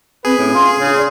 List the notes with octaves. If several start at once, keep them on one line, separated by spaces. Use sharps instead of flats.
C4 G#4 B4
A2 C#4
F4 C6
C#3 D4
D5